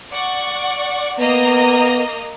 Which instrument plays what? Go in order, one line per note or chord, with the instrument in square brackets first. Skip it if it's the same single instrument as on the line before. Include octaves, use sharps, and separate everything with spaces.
[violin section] D5 F#5 C#6
[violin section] A#3 D#5 A#5 [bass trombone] B3